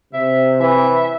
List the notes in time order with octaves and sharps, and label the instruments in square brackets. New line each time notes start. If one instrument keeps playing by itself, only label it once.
[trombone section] C3 [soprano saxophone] E5
[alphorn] E3 [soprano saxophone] E5